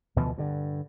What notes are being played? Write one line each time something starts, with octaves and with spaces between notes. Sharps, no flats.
D2 B2 E3 F3
G2 D3